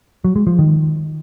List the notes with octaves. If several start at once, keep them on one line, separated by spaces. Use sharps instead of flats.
F#3
G#3
F3
D#3